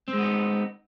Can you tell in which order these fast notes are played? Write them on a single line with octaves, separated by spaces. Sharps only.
C4 G#3 B3 D#4